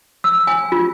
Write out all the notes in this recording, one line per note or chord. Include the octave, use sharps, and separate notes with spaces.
E6
G#5
F4